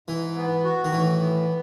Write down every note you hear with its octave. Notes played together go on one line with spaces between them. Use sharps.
G#2 E3
B3
F#4
D#3
A2 E3
B3